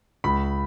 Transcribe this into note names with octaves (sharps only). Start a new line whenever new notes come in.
C#2 B5